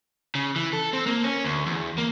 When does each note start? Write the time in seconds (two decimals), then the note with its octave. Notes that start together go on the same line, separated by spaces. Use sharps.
0.35 C#3
0.56 E3
0.73 A4
0.93 C4
1.06 A#3
1.24 C#4
1.44 D2
1.66 E2
1.98 A#3